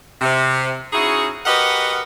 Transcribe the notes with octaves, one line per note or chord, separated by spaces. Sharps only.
C3
C#4 D#4 E4 F#4 G#4
F#4 G4 A#4 B4 D#5 F#5